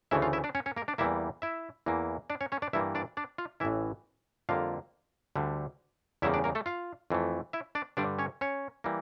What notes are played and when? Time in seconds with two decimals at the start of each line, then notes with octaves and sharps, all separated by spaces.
0.11 D2 C#3 E3 A3 E4 E5
0.22 F4 F5
0.33 E4 E5
0.44 D4 D5
0.55 C#4 C#5
0.66 C#4 C#5
0.77 A#3 A#4
0.88 D4 D5
0.98 E2 E3 G3 A#3 E4 E5
1.42 E4 E5
1.86 E2 E3 A#3
2.30 D4 D5
2.41 C#4 C#5
2.52 C#4 C#5
2.62 D4 D5
2.73 G2 E3 G3 A#3 E4 E5
2.95 D4 D5
3.17 D4 D5
3.38 F4 F5
3.60 A1 A2 E3 E4 E5
4.49 F2 D3 G3 A#3 F4 F5
5.36 D2 D3 G3
6.22 E2 C#3 G3 A#3 E4 E5
6.34 D4 D5
6.44 A#3 A#4
6.55 A3 A4
6.66 F4 F5
7.10 F2 E3 A3
7.53 E4 E5
7.75 D4 D5
7.97 G2 D3 G3 D4 D5
8.19 C#4 C#5
8.41 C#4 C#5
8.84 E3 G3 A#3